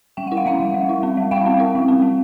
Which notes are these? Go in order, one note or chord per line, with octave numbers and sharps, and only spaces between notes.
G3 G5
E4 F#5
F5
G3 E5 F#5
G3
G3
E4
C4
G3
G3 F5 G5
C4
E4
G3
C4
G3